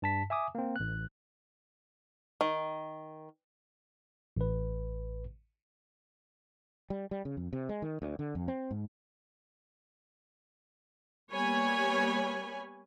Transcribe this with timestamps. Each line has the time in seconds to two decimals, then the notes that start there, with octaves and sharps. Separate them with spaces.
0.02 G2 A5 B6
0.30 E5 G#5 D6 D#6
0.55 A#3 C4
0.76 A1 F#6
2.41 D#3
4.37 A1 B4
6.90 G3
7.11 G3
7.25 C#3
7.37 F2
7.53 C3
7.69 G#3
7.82 D#3
8.02 D2
8.19 D3
8.35 F2
8.48 C4
8.71 G#2
11.31 G3 A#3 B3 C#5 G#5 B5